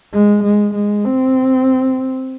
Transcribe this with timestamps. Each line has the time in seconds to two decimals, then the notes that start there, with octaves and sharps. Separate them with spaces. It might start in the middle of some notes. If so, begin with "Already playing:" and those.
0.13 G#3
0.43 G#3
0.74 G#3
1.05 C4